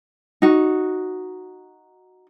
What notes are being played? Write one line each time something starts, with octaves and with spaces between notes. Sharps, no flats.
D#4 F#4